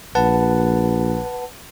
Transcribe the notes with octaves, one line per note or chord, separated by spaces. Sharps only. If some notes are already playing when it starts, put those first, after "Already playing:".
A#1 B4 F#5 A5